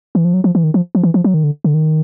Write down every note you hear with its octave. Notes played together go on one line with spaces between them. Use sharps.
E3
F3
F#3
F3
E3
D#3
F3
F3
E3
F3
F#3
D#3
D3
D3
D#3